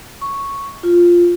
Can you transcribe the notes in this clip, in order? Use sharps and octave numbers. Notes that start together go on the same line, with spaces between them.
C#6
F4